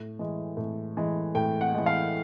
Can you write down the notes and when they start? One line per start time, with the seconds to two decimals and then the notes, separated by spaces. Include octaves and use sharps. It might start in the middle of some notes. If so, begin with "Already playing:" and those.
Already playing: A2
0.19 E3 G#3
0.57 A2
0.97 E3 G#3
1.35 A2 G5
1.61 F#5
1.74 E3 G#3
1.86 F5